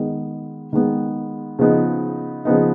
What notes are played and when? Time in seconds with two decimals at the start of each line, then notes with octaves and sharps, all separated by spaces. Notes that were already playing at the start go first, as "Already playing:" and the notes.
Already playing: D#3 G#3 B3
0.73 D#3 G#3 B3
1.59 C#3 F3 B3 D#4
2.45 C#3 F3 B3 D#4